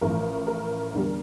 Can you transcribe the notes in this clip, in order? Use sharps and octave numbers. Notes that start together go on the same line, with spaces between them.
A1 A2 F3 A#4
A#4
E2 D3 G3